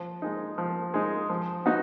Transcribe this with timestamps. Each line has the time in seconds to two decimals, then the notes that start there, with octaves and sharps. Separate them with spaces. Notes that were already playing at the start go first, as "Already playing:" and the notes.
Already playing: F3
0.22 G#3 D#4
0.58 F3
0.94 G#3 D#4
1.30 F3
1.66 B3 D#4 F#4